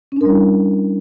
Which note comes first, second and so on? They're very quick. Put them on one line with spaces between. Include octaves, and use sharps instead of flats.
C#4 D4 A#4 G3 E4